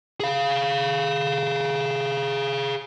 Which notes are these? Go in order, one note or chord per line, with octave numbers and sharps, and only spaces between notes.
G#4 F5